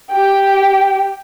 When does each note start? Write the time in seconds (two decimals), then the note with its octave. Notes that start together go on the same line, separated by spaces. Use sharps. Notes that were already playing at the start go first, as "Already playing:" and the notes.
0.11 G4 G5